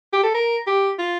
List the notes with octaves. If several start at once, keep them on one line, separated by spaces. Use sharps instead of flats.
G4
A4
A#4
G4
F4